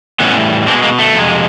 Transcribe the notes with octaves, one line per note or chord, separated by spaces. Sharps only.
A2 E3 G3 B3 C#4
B2 G#3 C4 D4
G#3 A#3
A3
F2 C3 G#3